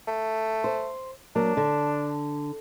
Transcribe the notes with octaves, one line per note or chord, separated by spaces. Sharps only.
A3
C5
F#3 A#3 D4
D3